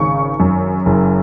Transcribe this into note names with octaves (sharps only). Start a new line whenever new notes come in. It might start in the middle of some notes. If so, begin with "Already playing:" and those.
Already playing: G#1 C#3 C#6
F#2
F#1